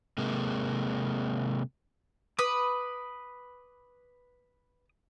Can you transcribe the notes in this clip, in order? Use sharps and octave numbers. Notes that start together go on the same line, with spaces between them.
C3 G#3 A#3
B4 D6 D#6